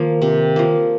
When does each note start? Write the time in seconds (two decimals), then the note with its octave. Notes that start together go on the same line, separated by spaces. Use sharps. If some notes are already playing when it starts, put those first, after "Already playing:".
Already playing: D#3 F3 A#3
0.22 C3
0.56 F3 A#3